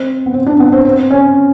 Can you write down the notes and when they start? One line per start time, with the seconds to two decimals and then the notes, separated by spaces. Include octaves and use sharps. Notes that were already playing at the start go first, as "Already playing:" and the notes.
Already playing: C4
0.26 B3
0.34 C4
0.46 D4
0.60 B3
0.72 C4
0.85 C4
1.11 C#4